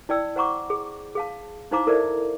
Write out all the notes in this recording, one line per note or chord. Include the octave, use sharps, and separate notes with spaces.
E4 D5 G5 E6
C5 F#5 A#5 C#6 D6
G#4
G#4 F5 A5
D#4 E4 C5 F5 A#5 D6
E4 A4 A#4 C5 D5 E5